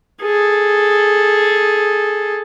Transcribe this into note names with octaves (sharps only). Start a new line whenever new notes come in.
G#4 A4